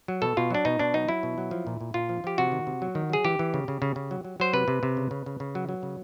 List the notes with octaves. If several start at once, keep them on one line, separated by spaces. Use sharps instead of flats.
F#3
B2 A4
B2 F4
F#3 D4
B2 D#4
B2 D4
F#3 D#4
F#3 E4
B2
F#3
F3
A#2
A#2
A#2 F4
F3
F3 G4
C3 F#4
D#3
C3
F#3
D#3
F#3 G#4
E3 G4
E3
C#3
C#3
C#3
C#3
F#3
F#3
F#3 C5
C3 B4
C3
C3
C#3
C#3
C#3
C#3
F#3
F#3
C#3